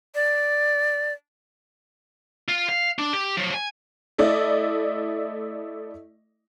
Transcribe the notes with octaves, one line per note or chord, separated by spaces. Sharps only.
D5
F4
F5
D4
G4
F3 F#3
G#5
A3 E4 D5 D#5